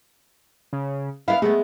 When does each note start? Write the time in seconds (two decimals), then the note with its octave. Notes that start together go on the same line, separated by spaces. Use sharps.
0.73 C#3
1.28 B3 E4 F5
1.42 G#3 A3 B3